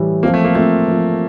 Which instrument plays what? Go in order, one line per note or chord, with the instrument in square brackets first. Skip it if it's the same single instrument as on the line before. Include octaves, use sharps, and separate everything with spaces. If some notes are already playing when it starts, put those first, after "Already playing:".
Already playing: [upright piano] A2 E3 G3
[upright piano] F3 C4 F4 [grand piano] A#3
[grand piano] A3
A#3
[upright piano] F3 C4 F4 [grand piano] A3
[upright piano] F3 C4 F4